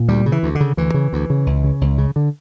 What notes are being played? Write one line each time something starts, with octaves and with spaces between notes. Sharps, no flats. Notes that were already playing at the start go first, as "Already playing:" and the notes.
Already playing: A#2
D2 G3
C#3
E3
D2
D3
C#3
D2 E3
C#3
D2
C#3
C#2
C#3
C#2
C#3
D3